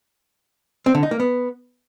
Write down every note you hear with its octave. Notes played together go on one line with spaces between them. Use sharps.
C4
D3
D#4
A#3
B3